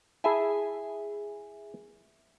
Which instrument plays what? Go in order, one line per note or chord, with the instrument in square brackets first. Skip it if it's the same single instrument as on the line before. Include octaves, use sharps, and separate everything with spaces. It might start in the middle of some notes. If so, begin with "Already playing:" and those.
[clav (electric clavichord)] E4 A5 [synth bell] G#4 E5 G#5